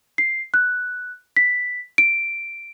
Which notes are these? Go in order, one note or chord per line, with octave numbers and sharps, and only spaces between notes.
C7
F#6
B6
D7